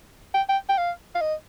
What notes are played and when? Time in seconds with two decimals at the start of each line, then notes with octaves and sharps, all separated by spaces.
0.34 G5
0.49 G5
0.69 G5
0.78 F5
1.15 F5
1.21 D#5